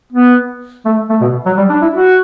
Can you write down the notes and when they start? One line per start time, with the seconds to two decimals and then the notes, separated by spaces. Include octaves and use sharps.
0.13 B3
0.85 A3
1.10 A3
1.21 B2
1.46 F#3
1.57 G3
1.70 D4
1.82 E4
1.94 F#4